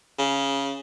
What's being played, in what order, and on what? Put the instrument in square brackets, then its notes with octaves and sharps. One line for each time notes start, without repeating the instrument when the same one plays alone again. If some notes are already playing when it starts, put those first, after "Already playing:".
[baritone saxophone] C#3